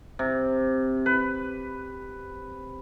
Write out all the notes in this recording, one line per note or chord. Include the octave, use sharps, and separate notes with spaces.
C3
B4